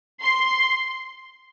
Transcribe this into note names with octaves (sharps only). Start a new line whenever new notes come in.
C6